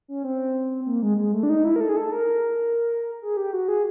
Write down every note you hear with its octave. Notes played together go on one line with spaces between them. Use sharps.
C#4
C4
A#3
G#3
G#3
A3
D4
D#4
E4
A#4
A4
G#4
A4
A#4
G#4
G4
F#4
G#4